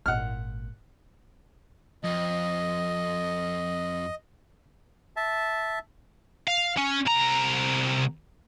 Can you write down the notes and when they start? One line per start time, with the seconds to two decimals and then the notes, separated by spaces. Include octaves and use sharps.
0.06 G#1 A#2 F#5 F6
2.03 F2 D#5
5.16 E5 A5
6.47 F5
6.78 C#4
7.07 C2 A#5